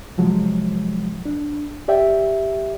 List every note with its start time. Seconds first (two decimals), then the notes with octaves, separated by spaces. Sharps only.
0.18 C3 F3 F#3 G#3
1.25 D4
1.88 G4 D5 E5 G5